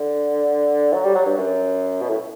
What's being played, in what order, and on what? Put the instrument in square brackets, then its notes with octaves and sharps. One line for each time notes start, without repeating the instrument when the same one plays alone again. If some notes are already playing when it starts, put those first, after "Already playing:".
Already playing: [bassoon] D3
F#3
G3
F#3
G2
F#2
B2
A2